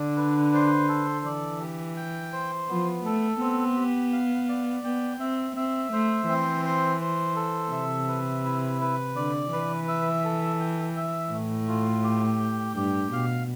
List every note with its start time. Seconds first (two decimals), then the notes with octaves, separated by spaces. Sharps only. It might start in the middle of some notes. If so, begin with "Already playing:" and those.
Already playing: D3 D4
0.17 B4
0.54 C5
0.88 A4
1.25 E3 D5
1.60 G4
1.97 G5
2.33 C5
2.69 F3 B3
3.05 A3 A4
3.40 B3 C4
3.76 G4
4.13 F5
4.49 D5
4.84 B3 G5
5.20 C4 E5
5.56 C4 E5
5.92 A3 C5
6.28 E3 C4
6.65 C5
7.01 C5
7.36 A4
7.72 C3 E5
8.08 B4
8.45 E4
8.81 B4
9.16 D3 D5
9.53 E3 B4
9.88 E5
10.25 A4
10.60 G5
10.96 E5
11.32 A2 A3
11.68 F4
12.04 G4
12.40 G5
12.75 G2 G4
13.12 B2 F5